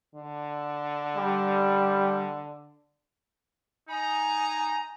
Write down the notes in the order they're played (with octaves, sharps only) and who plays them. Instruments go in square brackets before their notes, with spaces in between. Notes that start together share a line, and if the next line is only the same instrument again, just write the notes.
[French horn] D3
[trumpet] G3
[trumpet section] D#4 D#5 A#5 [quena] G#5